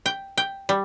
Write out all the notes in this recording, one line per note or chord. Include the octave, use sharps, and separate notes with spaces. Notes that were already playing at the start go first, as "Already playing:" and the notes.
G5
G5
G3